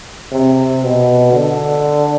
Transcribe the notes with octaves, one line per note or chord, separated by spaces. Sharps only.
C3
B2
D3